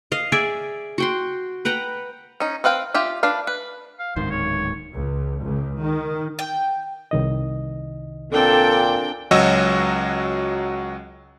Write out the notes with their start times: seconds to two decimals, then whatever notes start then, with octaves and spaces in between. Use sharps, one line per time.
0.12 D#5 F5
0.32 G#4 D5 E5 G#5
0.98 F#4 G5 C6
1.65 B4 F#5 G5 A#5
2.40 C#4 D#4
2.64 C4 B4 F5 G5
2.94 F4 G4 E5
3.23 D4 B4 F5
3.47 B4
3.99 F5
4.16 D1 G#2 D#3 C5
4.30 C#5
4.92 C#2
5.42 C#2
5.80 D#3
6.39 G5
7.11 C2 D#3 D#5
8.31 A#2 C4 D4 A4 G5
9.31 C#2 F#3 F#4 C#5 D#5 E6